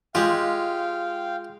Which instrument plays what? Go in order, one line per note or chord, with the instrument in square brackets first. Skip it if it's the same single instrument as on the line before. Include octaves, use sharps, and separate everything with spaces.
[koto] G#3 G4 [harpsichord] F4 [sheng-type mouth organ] F5 G5